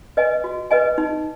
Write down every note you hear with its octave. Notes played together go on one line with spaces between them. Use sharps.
B4 D#5 G#5
F#4
B4 D#5 G#5
D#4